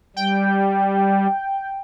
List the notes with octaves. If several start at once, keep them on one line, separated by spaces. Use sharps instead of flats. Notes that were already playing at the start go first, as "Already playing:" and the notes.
G3 G5